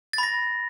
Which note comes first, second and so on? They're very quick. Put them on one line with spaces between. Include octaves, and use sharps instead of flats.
A6 B5 A#6